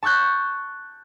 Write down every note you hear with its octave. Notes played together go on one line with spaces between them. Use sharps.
A5 C#6 E6 F#6 G6